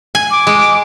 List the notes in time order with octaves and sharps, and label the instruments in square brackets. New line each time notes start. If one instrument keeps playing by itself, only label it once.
[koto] G#5
[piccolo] D6
[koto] G#3